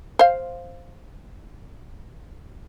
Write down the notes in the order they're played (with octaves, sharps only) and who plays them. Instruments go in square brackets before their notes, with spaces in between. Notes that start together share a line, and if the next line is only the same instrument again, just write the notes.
[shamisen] C5 F5